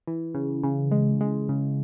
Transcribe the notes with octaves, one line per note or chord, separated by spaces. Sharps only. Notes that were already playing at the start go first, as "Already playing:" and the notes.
E3
C#3
C#3
G#3
G#3
C#3